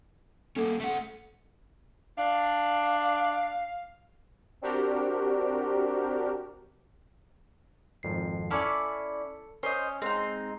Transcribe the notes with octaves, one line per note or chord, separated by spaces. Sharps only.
A#3 C#4 A4
A3 F#5
D4 F5
C4 D4 F#4 G4 A#4
G#1 F2 C7
C#4 E4 A4 D5 C#7
C#4 C5 D#5
G#3 C4 D#4